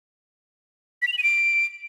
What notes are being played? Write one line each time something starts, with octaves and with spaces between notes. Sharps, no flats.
B6
F7
F#7
D#7
D7